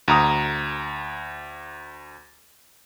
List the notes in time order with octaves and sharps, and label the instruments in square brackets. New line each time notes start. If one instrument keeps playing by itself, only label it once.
[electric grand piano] D2 A#5 D#6